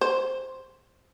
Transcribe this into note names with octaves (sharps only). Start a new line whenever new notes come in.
C5